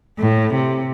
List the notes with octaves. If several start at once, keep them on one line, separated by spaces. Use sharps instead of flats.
A2
C3